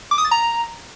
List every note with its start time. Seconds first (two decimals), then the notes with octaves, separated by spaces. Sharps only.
0.11 D6
0.18 D#6
0.25 A6
0.31 A#5